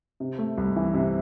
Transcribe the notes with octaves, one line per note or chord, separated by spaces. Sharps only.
C3
A3
C2
E3
C3